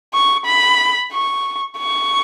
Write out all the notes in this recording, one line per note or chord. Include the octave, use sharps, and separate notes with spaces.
C#6
B5
C#6
C#6